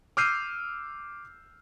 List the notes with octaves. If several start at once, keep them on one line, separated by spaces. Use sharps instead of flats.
D6 E6 F6 G6 C7 D#7